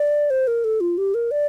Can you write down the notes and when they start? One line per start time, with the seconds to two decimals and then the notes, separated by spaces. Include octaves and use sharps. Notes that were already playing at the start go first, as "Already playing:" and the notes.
Already playing: D5
0.30 C5
0.47 A#4
0.64 A4
0.81 F4
0.98 G4
1.14 A#4
1.31 D5